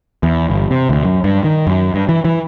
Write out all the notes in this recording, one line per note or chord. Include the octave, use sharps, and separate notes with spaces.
E2
G1
C3
D2
F#2
G2
D#3
F#2
G2
E3
E3